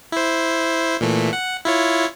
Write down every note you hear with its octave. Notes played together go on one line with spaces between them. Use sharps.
E4 C5
A#2 E3 A3
F#5
E4 F4 C#5